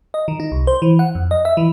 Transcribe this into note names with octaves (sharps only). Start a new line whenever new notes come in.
D#5
D#3
D#4
C2
C5
E3
F#5
F2
D#5
E5
E3